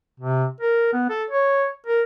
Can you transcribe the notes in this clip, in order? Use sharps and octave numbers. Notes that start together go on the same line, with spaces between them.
C3
A#4
B3
A4
C#5
A#4